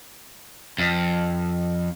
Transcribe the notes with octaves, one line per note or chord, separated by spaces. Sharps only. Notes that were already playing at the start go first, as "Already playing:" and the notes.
F2